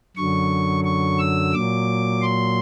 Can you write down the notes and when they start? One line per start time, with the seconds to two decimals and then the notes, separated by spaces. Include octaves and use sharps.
0.16 F#2 D3 F#3 C#6
0.84 C#6
1.19 E6
1.53 A#2 F#3 D6
2.22 C6